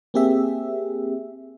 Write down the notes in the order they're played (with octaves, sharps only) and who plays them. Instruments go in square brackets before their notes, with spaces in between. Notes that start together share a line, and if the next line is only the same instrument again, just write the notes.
[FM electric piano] A#3 C4 G4 G#4 E5